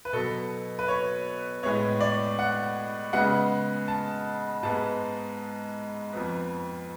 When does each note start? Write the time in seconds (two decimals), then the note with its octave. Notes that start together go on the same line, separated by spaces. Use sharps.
0.05 B4
0.13 B2 F#3 B3 A4
0.79 B4
0.88 C#5
1.63 A2 G#3 B3 C#5
2.00 D5
2.39 F#5
3.13 C#3 G#3 B3 F#5
3.88 A5
4.63 G#2 G#3 B3 A5
6.13 F2 F3 B3